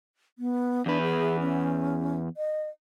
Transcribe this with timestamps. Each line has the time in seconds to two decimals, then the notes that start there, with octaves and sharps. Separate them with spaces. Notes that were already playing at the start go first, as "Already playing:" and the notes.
0.39 B3
0.86 E2 D4 B4
1.02 G#4
1.40 C#4
2.37 D#5